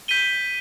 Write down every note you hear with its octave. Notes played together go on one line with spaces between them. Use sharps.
G6 B6 D#7 G7